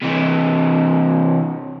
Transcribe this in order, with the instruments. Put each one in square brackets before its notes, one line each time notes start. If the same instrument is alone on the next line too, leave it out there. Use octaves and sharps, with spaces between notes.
[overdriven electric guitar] C3 E3